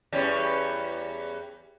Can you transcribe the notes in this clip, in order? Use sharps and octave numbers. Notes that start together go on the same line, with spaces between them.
E2 G3 C#4